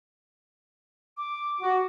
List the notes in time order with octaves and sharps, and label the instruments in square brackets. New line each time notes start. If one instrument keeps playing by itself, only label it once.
[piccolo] D6
[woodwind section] F#4